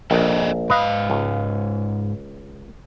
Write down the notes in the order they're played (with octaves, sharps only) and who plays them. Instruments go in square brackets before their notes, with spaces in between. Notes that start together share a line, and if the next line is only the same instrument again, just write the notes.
[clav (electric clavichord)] A#1 [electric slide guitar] A4 A#4 D#5
[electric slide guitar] G#2 F5 [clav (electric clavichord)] B4 D#5
[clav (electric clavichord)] C#2